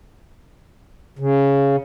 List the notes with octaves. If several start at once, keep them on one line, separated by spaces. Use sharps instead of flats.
C#3